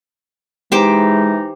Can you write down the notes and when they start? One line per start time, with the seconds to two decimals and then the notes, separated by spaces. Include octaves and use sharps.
0.72 E3 G#3 D#4 G4 C5 D6